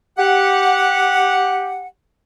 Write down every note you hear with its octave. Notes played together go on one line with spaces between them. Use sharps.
G4 F#5